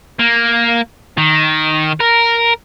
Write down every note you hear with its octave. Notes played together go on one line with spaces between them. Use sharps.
A#3
D#3
A#4